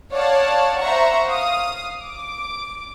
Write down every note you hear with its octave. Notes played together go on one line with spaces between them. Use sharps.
C#5 D5 F5 F#5 A5
C5 E5 F#5 A#5 C#6
F5 D#6
D6